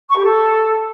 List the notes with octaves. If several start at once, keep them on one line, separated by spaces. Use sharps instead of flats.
C#6
G4
A4